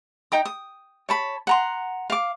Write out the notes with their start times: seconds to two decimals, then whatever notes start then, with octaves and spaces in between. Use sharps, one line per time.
0.32 D#4 G5 D#6
0.45 D#6
1.09 C#5 A5 B5
1.47 F#5 A#5 C6
2.10 F5 D6